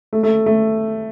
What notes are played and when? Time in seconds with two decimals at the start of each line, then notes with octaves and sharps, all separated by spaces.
0.13 A3
0.23 A3
0.46 A3